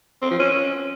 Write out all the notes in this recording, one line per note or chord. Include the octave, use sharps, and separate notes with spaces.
C4
F3
C#4